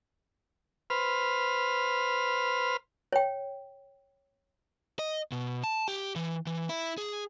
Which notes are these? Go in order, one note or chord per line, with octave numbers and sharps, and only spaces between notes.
B4 C5 F6
C#5 G5
D#5
B2
A5
G4
E3
E3
E4
G#4